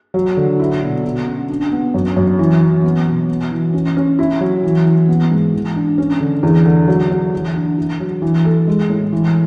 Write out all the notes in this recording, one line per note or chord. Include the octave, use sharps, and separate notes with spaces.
F#3
D3
E4
B2
B2
C#4
D4
B3
F#2
F#2
E3
E3
B3
B2
B3
E3
C#4
C#4
E4
F#3
E3
E3
B3
G#2
E3
D4
C#4
D3
E2
D3
F#3
F#3
E3
D4
E4
F#3
E3
A4
G#3
A2
E3